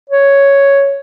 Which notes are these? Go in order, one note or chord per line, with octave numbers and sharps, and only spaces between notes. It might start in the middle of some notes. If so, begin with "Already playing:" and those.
C#5